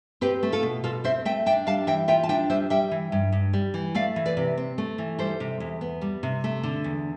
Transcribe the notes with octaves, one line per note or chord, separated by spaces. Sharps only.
C4 G4 B4
A3
F4 A4
B2
B2 F4 A4
C4 C5 E5
A3 E5 G5
D4 E5 G5
G3 F5 A5
E3 E5 G5
F4 E5 G5
A5
D4 E5 G5
G3 C5 E5
G3 E5 G5
E3
G2
G2
G3
E3
A3 D5 F5
E3
B4 D5
C3
C4
A3
E3
G3 A4 C5
C3
E2
B3
G3
C3
A3
D3
E2